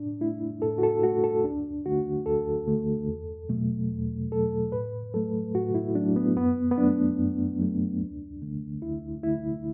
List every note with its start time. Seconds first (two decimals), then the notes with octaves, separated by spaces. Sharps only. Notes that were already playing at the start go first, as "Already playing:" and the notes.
Already playing: A2 D4
0.21 A3 E4
0.62 A2 A4
0.78 F#4
0.83 A4
1.03 A3 F#4
1.24 A4
1.44 D2 D4
1.86 D3 A3 F#4
2.26 D2 A4
2.67 D3 A3
3.08 E2
3.49 B2 F#3 A3
3.91 E2
4.32 B2 F#3 A3 A4
4.72 A2 B4
5.14 F#3 A3 A4
5.55 A2 F#4
5.75 E4
5.95 F#3 A3 D4
6.16 B3
6.36 F#2 B3
6.71 B3
6.78 F#3 A3 D4
7.19 F#2
7.59 F#3 A3
8.01 D2
8.42 D3 A3
8.82 D2 E4
9.23 D3 A3 E4